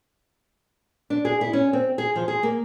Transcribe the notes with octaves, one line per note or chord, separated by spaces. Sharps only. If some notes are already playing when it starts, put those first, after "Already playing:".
D4
G#4
E4
C#4
C4
G#4
F3
G#4
A#3